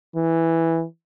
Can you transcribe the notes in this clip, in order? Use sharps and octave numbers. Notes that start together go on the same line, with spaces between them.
E3